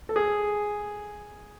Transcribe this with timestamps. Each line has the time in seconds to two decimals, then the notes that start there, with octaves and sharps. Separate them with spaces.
0.09 A4
0.16 G#4